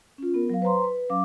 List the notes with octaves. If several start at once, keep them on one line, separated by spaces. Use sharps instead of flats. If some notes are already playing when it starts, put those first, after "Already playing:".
C#4 F4
B3 A#4
F#3 F5
B4 C5 A#5 C6
B4
F#3 C#4 F5 D6